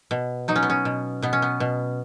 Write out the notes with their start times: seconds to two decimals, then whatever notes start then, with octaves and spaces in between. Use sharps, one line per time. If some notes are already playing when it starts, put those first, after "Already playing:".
0.11 B2
0.48 F#3 D#4
0.56 C#4
0.63 B3
0.70 C#4
0.85 B2
1.22 B2 B3
1.33 C#4
1.42 B3
1.60 B2